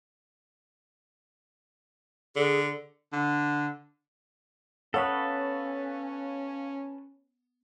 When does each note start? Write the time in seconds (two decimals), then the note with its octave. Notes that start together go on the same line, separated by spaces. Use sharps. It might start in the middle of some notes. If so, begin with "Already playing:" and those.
2.36 D3 G#4
3.12 D3
4.94 B3 C#4 A4 B4 C#5 F5